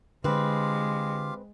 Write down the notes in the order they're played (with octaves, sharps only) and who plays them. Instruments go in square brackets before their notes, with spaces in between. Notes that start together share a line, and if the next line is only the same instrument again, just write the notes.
[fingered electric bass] D3 [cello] G#3 [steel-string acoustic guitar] C4 B4 [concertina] F4 G4 F5